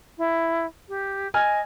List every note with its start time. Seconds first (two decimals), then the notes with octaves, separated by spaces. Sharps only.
0.18 E4
0.89 G4
1.34 D#5 G#5 F6 G#6